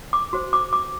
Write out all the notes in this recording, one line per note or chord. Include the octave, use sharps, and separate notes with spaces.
D6
F#4 C5
D6
D6